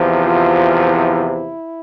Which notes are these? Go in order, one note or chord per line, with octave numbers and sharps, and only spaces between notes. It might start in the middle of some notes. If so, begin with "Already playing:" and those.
Already playing: E2 C3 F3
F4
E4